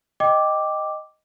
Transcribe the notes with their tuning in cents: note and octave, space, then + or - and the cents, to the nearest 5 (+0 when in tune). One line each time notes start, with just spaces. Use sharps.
D#5 +0 G5 +0 D6 +0